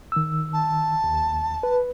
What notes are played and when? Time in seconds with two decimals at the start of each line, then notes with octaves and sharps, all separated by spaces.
0.12 D#3 E6
0.53 A5
1.04 D#2
1.63 B4